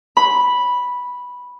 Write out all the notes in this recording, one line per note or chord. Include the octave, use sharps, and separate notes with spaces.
B5